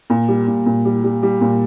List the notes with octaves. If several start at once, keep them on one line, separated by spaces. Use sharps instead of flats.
A#2
G3
A#2
A#2
G3
G3
G3
A#2